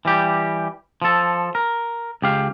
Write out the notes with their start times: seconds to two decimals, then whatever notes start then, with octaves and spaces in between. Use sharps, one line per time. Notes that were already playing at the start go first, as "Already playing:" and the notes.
0.05 E3 G3 G4
1.02 F3 A4
1.55 A#4
2.22 C#2 G4 F5